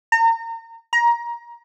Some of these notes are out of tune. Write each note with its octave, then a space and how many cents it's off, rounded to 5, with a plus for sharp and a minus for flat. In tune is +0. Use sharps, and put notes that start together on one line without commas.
A#5 -35
A#5 +20